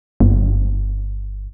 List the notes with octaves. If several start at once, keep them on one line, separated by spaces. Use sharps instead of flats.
G1